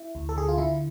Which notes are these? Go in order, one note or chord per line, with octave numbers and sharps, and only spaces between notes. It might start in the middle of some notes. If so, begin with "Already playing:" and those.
Already playing: E4
D2
A4
D3 G#4
F4
D3 E4